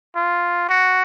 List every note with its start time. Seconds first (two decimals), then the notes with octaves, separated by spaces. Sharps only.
0.16 F4
0.69 F#4